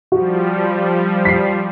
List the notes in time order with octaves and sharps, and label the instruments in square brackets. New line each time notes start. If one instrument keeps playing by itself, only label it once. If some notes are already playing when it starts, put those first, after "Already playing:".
[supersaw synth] F3 G3 [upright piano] F#4
[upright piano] B6 C7